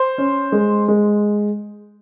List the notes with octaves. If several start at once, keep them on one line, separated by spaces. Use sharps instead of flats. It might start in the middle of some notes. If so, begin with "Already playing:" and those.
Already playing: C5
C#4
G#3
G#3